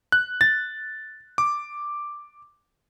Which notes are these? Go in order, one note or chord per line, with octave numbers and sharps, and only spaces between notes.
F#6
A6
D6